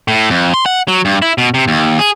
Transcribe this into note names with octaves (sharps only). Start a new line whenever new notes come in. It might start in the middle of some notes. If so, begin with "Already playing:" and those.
A2
F2
C6
F#5
F#3
G2
E4
B2
C3
D#2
G#4